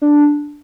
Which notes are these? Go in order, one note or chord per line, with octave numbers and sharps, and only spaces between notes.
D4